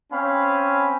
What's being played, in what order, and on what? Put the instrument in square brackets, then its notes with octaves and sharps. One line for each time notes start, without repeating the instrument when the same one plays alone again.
[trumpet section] C4 C#4 F5 G#5 B5